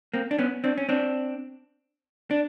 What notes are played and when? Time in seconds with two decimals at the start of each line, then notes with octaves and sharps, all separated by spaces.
0.14 A#3 C4
0.31 D4
0.38 B3 C#4
0.64 C4 D4
0.78 C#4
0.89 C4 D4
2.31 D4